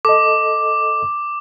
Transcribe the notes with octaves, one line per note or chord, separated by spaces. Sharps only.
A4 D#5 D6